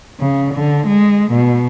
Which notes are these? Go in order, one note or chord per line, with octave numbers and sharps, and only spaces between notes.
C#3
D3
G#3
B2